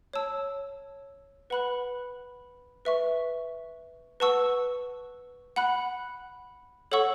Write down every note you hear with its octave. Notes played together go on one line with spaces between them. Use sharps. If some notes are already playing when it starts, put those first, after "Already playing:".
C#5 A5 E6
B4 F#5 B5 F#6
B4 E5 C#6
B4 F#5 A5 C#6 E6
F#5 B5 F#6
A4 C#5 F#5 C#6 E6